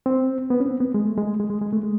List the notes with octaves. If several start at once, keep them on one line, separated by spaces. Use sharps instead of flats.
C4
B3
C#4
C4
B3
G#3
A3
G#3
G#3
G#3
G#3
A3
G#3